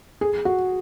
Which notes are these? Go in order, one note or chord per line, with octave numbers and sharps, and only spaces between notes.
G#4
F#4